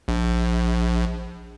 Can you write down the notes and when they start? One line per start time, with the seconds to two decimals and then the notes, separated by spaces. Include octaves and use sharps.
0.08 A#1